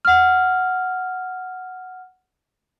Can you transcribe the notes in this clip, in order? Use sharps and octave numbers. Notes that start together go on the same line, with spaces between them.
F#5 F6